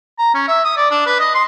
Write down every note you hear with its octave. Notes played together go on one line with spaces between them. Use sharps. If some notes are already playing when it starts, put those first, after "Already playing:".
A#5
C#4
E5
D#6
D5
D4
B4
D#5
C6